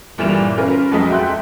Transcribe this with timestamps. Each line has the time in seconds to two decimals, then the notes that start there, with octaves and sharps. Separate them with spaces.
0.18 G1 A#2 E3 G3 E7 F7
0.58 C#4 F4 A#4 B4
0.91 F2 F#3 G#3 A4 D#5 B6
1.10 E5 G5 C6 F#6